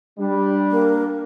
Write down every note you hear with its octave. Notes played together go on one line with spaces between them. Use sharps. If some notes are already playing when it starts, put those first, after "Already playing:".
G3 D4
A#3